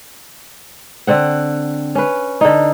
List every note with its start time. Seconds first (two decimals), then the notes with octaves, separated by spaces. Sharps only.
1.07 D3 C4 F#5
1.95 C#4 B4
2.41 D3 D#4